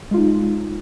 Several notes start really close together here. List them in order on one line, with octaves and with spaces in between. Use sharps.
G#3 F4 D#4